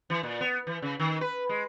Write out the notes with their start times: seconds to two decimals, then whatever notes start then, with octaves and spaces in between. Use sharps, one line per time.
0.10 E3
0.23 A#2
0.41 B3
0.67 E3
0.82 C#3
0.99 D#3
1.21 B4
1.49 G#3